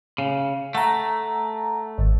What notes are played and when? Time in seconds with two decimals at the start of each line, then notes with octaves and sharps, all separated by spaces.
0.18 C#3
0.75 A3 F#5 A#5
1.98 G#1